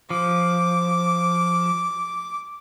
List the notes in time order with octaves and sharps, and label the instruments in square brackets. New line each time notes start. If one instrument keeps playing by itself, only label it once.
[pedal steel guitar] F3 [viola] D6